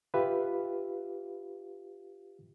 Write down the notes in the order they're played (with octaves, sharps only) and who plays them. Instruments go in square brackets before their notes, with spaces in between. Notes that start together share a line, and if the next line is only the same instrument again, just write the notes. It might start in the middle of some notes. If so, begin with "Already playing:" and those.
[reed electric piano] F4 G4 B4 E5 F5